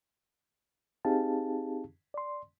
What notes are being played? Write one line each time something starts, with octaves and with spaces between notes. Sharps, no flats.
C4 D#4 G4 G#4 F5 A5
D5 C6